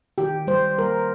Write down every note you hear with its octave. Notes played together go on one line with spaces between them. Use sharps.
D#3 G4
G3 C5
G3 A#4